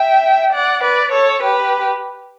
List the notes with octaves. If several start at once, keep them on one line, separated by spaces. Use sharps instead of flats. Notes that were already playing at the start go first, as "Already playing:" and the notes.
Already playing: E5 G5
D5 F#5
B4 D5
A4 C#5
G4 B4